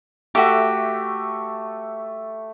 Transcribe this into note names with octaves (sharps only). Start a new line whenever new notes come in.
A3 F#4 G4 E5